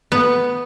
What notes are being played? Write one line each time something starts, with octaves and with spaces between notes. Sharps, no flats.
B3